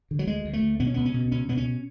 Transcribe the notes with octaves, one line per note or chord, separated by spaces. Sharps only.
D3
F#3
D2 G#3
D2
A3
D2
B2 B3
C#4
C#2 B3
C#4
B2
C#2 C#4
B2 B3
C#4